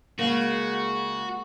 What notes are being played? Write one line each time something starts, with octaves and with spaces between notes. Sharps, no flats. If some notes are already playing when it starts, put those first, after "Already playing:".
C#3 G#3 A#3 F#4